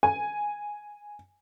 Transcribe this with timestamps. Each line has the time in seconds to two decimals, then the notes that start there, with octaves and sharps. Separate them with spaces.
0.03 G#5